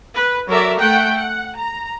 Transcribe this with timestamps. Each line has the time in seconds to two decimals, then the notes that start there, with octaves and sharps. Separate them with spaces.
0.13 B4
0.48 F#3 A4 A#4 D5 E5
0.79 A3 F#5 G5
1.14 F#5
1.57 A#5